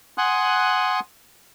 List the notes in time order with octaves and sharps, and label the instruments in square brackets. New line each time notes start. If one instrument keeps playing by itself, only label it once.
[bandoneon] F#5 G#5 C6 D#6 F#6